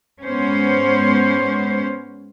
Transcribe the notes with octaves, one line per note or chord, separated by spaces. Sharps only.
G#2 B3 C#4 C5